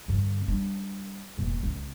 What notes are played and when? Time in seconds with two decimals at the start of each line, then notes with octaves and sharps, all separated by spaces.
0.08 G2 D3
0.48 G3 D4
1.38 E1 A#2
1.63 C#2